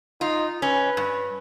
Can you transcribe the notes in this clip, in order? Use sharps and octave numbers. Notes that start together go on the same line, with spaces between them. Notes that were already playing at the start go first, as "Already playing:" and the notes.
D#4 F4
C#4 B4
G2